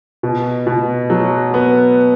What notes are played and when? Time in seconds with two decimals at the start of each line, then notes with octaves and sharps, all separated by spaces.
0.23 B2
0.67 B2
1.10 F#3
1.54 B3